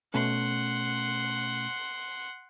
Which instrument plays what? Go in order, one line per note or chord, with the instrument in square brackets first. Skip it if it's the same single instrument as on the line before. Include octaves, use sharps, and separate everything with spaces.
[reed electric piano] B2 A3 C#4 [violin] F#5 C6